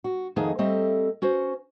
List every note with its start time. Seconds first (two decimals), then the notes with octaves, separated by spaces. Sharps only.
0.04 F#4
0.36 F2 D#3 A3 D#4 G#4 F#5
0.58 G3 A3 C4 A4 D#5 E5
1.22 C#4 F#4 C5